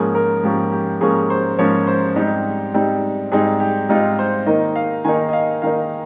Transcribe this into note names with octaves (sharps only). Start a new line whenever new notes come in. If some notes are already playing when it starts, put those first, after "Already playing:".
Already playing: G#2 F3 A#3 C#4 G#4
A#4
G#2 F3 A#3 C#4 G4
G4
G#2 F3 A#3 C#4 G#4
C5
G#2 F3 A#3 C#4 C#5
C5
G#2 G3 C4 D#4 G4
G#2 G3 C4 D#4
G#2 G3 C4 D#4 G#4
G4
G#2 G3 C4 D#4 F4
C5
D#3 A#3 D#4 D#5
F5
D#3 A#3 D#4 G#5
D#5
F5
D#3 A#3 D#4 F5